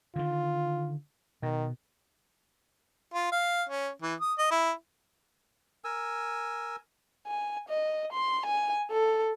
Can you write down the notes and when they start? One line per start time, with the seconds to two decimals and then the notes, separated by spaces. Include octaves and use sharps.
0.16 D3 D#3 F4
1.43 B2 D#3
3.14 F4
3.32 F5
3.70 C#4
4.02 E3
4.21 D#6
4.39 D#5
4.51 E4
5.84 A#4 G#5 E6
7.27 G#5
7.69 D#5
8.13 C6
8.46 G#5
8.91 A4